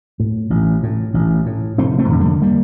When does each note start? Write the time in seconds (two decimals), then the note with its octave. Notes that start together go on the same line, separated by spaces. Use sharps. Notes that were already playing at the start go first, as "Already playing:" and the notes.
0.20 A2
0.50 A1
0.83 A2
1.14 A1
1.46 A2
1.78 F1 A3 C4
1.99 A3 C4
2.09 F2 D3
2.20 G3 A#3
2.42 G3 A#3